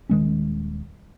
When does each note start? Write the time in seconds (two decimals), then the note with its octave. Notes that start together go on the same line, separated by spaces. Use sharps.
0.10 D#1 D#3 G#3 C#4